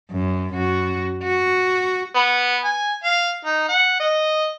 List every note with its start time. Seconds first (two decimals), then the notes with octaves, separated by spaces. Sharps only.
0.11 F#2
0.54 F#2 F#4
1.23 F#4
2.15 B3
2.64 G#5
3.04 F5
3.45 D#4
3.69 F#5
4.00 D#5